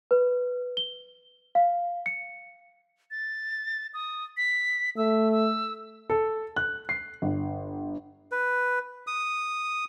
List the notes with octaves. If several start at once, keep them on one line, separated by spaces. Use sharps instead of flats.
B4
G7
F5
C#7
A6
D#6
B6
A3 E6
E6
A4
F#6
C7
G1
B4
D#6